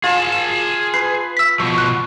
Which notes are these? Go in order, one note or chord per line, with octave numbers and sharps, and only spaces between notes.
F4 G#4 A5
E7
B4 C7
E6 B6
B2 F3 C#6
F#6